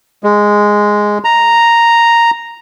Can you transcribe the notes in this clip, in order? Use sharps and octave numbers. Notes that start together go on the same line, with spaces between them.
G#3
A#5